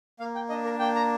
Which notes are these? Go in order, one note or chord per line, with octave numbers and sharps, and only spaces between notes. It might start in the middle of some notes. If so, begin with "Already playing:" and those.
A#3 F5
G5
D4 D#5
A#4
A#3 G5
A#5